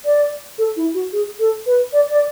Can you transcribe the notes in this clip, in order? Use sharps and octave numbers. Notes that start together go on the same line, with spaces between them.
D5
A4
E4
F#4
G#4
A4
B4
D5
D5